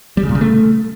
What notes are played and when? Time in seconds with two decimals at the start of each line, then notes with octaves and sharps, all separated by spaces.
0.17 G3
0.23 C#3
0.29 A#2
0.35 C#3
0.41 A3